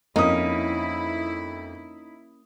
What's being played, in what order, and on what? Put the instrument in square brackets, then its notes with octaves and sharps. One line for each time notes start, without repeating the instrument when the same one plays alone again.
[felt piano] F2 D#6 [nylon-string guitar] A#3 C#4 [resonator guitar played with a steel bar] D#4 [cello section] E4